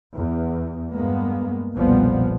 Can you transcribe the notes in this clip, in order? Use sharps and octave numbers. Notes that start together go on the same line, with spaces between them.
E2
G2 G#3 A#3 B3
F1 B1 A#2 F3 G3 B3